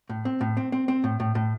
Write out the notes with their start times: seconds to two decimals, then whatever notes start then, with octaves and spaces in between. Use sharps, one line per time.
0.09 A2
0.25 C4
0.41 A2
0.57 C4
0.72 C4
0.88 C4
1.04 A2
1.20 A2
1.35 A2